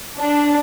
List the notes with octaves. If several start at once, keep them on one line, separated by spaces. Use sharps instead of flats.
D4